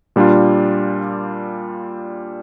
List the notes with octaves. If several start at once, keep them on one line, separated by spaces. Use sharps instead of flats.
A#2 G3 D4 F4